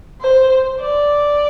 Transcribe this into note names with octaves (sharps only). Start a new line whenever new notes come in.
C5
D5